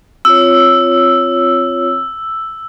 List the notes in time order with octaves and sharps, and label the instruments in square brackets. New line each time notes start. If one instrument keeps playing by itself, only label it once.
[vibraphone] C4 F4 C#5 [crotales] E6